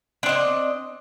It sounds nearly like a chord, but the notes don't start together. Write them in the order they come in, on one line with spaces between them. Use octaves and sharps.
D4 C4 D#5